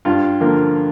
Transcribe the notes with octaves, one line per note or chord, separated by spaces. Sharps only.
G2 F4
D3 F3 A#3